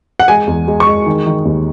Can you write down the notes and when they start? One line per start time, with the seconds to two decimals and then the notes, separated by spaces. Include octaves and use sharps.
0.20 F#5
0.28 G#3 G#5
0.47 E2
0.68 G#3
0.80 C#6
0.86 G#3
1.06 D#3
1.26 D#3
1.45 D#2